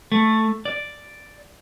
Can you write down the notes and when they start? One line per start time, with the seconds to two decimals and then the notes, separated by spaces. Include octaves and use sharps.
0.12 A3
0.65 D5